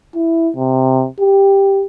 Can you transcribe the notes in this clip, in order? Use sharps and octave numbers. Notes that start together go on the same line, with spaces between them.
E4
C3
G4